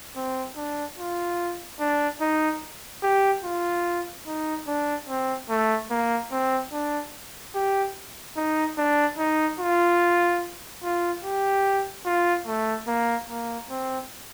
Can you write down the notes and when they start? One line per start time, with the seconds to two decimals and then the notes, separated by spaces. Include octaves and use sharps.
0.16 C4
0.57 D4
0.98 F4
1.80 D4
2.21 D#4
3.03 G4
3.44 F4
4.27 D#4
4.68 D4
5.08 C4
5.49 A3
5.90 A#3
6.32 C4
6.72 D4
7.55 G4
8.37 D#4
8.78 D4
9.18 D#4
9.60 F4
10.83 F4
11.24 G4
12.05 F4
12.47 A3
12.87 A#3
13.30 A#3
13.70 C4